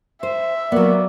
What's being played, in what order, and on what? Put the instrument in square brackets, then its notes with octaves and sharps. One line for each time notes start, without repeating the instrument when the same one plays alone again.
[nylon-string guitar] C5 [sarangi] E5
[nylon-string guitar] F#3 B3 [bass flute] A#3 [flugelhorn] D5